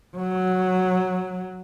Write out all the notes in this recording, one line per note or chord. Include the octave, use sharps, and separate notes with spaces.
F#3